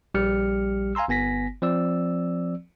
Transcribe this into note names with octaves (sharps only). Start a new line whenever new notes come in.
A#1 G3 G4 F6 C#7
F5 G#5 A#5 C6 E6
G1 B3 G#5 A#6 B6
F3 C4 D5 E6